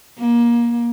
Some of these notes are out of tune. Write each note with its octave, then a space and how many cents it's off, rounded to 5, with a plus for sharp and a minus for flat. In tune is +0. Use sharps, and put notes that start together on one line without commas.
A#3 +25